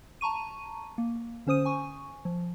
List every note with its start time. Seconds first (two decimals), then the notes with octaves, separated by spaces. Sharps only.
0.21 A5 A#5 C#6 D#7
0.98 A#3
1.47 D3 C#4 C5 D#6 D#7
1.65 G#5 C#6
2.25 F3